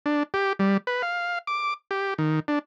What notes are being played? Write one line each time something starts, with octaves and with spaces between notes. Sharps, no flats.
D4
G4
G3
B4
F5
D6
G4
D#3
D4